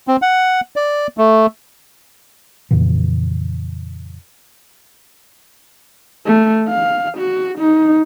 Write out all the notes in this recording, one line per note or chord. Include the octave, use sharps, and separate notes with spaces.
C4
F#5
D5
A3
F2 A#2 C#3 E3
A3
F5
F#4
D#4